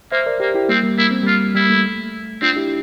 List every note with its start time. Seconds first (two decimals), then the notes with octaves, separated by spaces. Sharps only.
0.12 A#3 C5 E5
0.26 A#4 D5
0.40 A#3 G4 A#4
0.54 E4 G4
0.69 G3 A#3 C4
0.83 G3 A#3
0.98 A#3 E4
1.11 C4
1.23 G3 A#3 F4
1.55 G3 E4
1.66 A#3
1.70 A3
2.42 C4 D4 F4
2.56 E4 G4